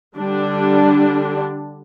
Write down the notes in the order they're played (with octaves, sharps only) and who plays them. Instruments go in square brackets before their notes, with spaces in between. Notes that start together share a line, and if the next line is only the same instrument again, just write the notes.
[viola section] D3 G3 D4